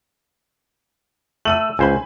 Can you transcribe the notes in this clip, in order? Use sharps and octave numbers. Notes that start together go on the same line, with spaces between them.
A3 E6 D#7 F#7
C#2 C5 G#5 B5